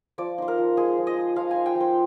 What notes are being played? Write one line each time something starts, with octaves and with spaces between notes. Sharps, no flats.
F3 D5
D#4 C5
A#4
F3
G#3 G#4
F3
D#5
D#4
F3 F5
D#4 G#5
G5
F3
C5